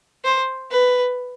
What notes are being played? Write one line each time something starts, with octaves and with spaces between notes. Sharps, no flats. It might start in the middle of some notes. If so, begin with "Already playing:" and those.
C5
B4